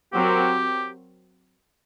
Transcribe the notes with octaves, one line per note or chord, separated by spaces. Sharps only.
F#3 C4 F#4 G4 A#4